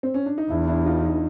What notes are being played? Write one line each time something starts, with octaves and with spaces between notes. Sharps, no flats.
C4
C#4
D4
D#4
E2 D4 E4
D4 E4
D#4 F4
D#4 F4